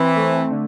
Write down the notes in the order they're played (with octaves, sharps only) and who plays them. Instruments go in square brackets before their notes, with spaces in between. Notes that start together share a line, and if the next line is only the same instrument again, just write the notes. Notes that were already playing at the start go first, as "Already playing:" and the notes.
Already playing: [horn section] E3 [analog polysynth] C4
[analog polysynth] A3
D3